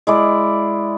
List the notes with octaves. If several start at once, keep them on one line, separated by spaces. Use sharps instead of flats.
G#3 E4 D5